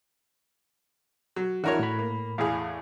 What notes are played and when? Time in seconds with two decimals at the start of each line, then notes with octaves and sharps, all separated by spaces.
1.36 F#3
1.64 E3 D4 E4 F#4 A#4 C#5
1.79 A2 B5
1.99 A#3
2.38 E2 A2 G#4 F5